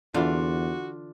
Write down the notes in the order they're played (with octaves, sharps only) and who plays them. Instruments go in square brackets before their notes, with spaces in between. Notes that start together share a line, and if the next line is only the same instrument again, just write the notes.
[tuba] E2 [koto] D3 E3 [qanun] D4 F4 [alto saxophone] F#4